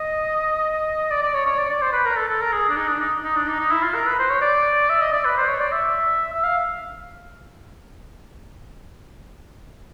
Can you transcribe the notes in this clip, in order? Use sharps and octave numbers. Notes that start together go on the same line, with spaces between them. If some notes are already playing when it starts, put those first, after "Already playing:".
Already playing: D#5
D5
D5
C#5
C#5
D5
D5
C5
B4
A#4
A4
A4
A#4
G#4
D4
D#4
D4
D#4
D#4
D4
D#4
D#4
E4
F4
A#4
B4
C5
C#5
D5
E5
D#5
D5
B4
C5
C#5
D5
E5
E5
F5